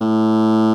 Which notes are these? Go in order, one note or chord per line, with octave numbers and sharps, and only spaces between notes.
A2